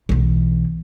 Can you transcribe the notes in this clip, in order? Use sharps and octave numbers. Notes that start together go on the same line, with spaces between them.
B1 E3